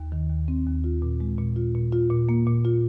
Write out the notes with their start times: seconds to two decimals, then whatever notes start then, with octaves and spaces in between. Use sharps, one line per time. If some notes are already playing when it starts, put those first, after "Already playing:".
Already playing: D#2
0.12 D#3
0.30 D#2
0.48 C4
0.66 D#2
0.84 F4
1.02 A#2
1.20 G#3
1.38 A#2
1.56 F4
1.75 A#2
1.92 F4
2.10 A#2
2.29 A#3
2.47 A#2
2.65 F4